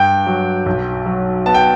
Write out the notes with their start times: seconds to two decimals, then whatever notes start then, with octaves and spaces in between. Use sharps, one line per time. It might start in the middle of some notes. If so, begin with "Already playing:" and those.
Already playing: G2 G5
0.26 F#3
0.66 B1
1.06 F#3
1.46 B3 A5
1.54 G5